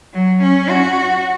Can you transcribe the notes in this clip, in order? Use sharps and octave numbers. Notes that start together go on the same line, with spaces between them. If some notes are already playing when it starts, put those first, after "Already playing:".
F#3
C#4
F#4